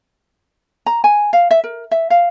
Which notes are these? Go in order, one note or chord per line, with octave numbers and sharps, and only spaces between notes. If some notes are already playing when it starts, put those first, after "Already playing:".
A#5
G#5
F5
E5
A#4
E5
F5